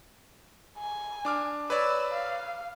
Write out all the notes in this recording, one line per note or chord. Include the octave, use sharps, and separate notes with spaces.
G#5
D4 D6 F6
B4 C#5 D5 E6
F5